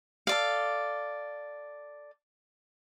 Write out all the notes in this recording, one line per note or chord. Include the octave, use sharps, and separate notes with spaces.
A4 D5 F5